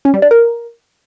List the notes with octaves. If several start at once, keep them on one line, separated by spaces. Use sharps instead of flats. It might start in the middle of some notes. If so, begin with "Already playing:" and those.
C#4
G3
D4
A#4